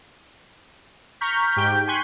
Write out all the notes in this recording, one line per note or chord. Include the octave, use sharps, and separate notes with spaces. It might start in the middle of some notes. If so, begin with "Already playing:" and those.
A#5 C#6 F6 G6 B6
G#2 G4 G5 G6
G#5 C6 C#6 F#6 G6 B6